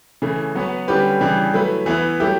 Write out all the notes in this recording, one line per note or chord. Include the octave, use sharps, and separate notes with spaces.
C#3 E3 A3
F#3 B3 F#4 B4
D3 G3 C#4 G4 B4
C#3 E3 G3 D4 G4
F#3 A3 E4 B4
E3 B3 E4 B4
F#3 A3 E4 G4